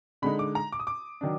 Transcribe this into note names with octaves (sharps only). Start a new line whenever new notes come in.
D3 G#3 D#4 B5
D6
A#5
D6
D#6
D6
D#3 F#3 D4